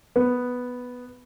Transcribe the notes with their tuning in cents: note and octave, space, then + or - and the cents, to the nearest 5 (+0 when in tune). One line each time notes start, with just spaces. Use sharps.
B3 +0